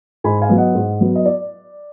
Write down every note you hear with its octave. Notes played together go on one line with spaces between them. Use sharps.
G#2 G#5 B5
F5 G#5
F#3 B3
D#5 F#5
G#2
F#3 B3
D#5
D5